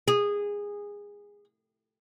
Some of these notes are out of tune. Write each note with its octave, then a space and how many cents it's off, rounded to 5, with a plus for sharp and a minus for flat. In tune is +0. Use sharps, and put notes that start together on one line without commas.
G#4 -20